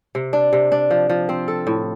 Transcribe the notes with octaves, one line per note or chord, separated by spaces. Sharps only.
C3
D4
C3
D4
F3
F3
C4
A4
A2